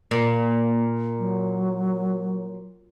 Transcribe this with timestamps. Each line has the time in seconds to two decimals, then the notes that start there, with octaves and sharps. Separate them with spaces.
0.11 A#2 A#3
1.19 F#3